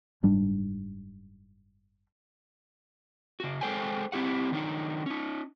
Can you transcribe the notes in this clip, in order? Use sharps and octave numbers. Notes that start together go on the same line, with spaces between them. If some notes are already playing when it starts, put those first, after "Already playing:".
F#1 G#2 G3 D4
C#3 F#4
G#3 A4 C5 G5 G#5
C4 E4 G4 F#5
D#3 F#3 D4 D#4
C#4 D#4